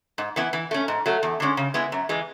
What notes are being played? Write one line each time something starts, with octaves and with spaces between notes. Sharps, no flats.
G#2
E3 B3 E4
E3
A3 C#4
G#2
F#3 A3
E2
D3 G#3 C#4
C#3
G#3 B3 E4
F#2
E3 G#3